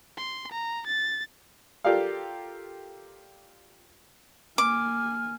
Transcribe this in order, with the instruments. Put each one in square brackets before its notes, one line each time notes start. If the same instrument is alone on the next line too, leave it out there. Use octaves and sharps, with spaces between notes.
[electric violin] C6
A#5
A6
[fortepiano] F4 G4 A4 A#4 D5 F5
[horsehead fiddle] A#3 G#5 [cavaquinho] D6 [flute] F6